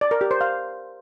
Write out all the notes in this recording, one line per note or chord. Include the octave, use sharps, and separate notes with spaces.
D5
A#4
G4
C5
F5